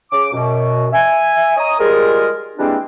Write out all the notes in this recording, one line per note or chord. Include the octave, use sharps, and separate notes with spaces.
C#3 D6
F#2 B2
E5 G#5
C#5 D#5 A#5 D#6
F3 G3 G#3 F4 G#4 A#4
E3 G3 G#3 A#3 C4 D4